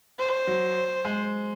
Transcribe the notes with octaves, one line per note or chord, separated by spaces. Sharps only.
C5
F#3
G#3